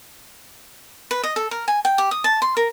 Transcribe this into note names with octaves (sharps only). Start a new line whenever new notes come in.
B4
D#5
A4
A#4
G#5
G5
G4
D#6
A5
C6
A#4